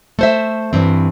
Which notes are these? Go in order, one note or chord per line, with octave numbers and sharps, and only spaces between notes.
A3 C5 E5
G2 E3 C4